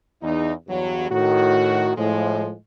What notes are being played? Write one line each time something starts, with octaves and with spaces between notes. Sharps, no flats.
E2 D#4
E2 G2 F#3
A2 D#3 F#4
A2 F3 G#3